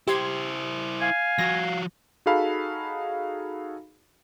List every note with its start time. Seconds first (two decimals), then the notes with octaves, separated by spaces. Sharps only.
0.07 E4 G4 C5 C6 G#6
1.01 F5 G#5
1.38 F3 F#4 A#6
2.26 D#4 F#4 G#4 A4 F5 B5